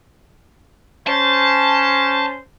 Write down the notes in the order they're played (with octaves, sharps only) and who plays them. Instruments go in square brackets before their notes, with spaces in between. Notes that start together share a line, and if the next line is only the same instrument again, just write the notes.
[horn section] C#4 C5 [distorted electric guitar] A5